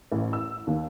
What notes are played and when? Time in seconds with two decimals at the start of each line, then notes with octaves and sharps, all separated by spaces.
0.12 A1
0.33 E6
0.67 D#2